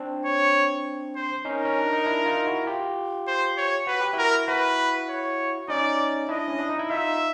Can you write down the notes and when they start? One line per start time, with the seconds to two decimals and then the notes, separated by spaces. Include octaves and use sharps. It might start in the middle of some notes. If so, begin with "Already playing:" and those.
Already playing: C4 D4
0.25 C#5
1.15 C5
1.45 C#4 D#4 A#4
1.65 C#4
1.79 D4
1.93 D#4
2.06 D4 E4
2.26 D#4 F4
2.46 E4 F#4
2.66 F4 G4
3.27 C5
3.57 C#5
3.87 F#4 B4
4.01 G4
4.13 E4 F#4 A#4
4.48 E4 F#4 B4
5.09 C#5
5.68 C#4 D#4 D5
6.29 D4 E4 D#5
6.48 C#4
6.59 D4
6.69 D#4
6.79 E4
6.90 D#4 F4 E5